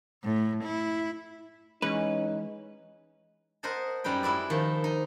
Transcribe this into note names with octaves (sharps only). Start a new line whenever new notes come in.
A2
E4
E3 G#3 C#4 D#4 B4
A#4 C5 D#5 F#5 A5
F#2 G3 D#4 B4 G5
G#3 E4 B4 D5
D#3 F3
D#4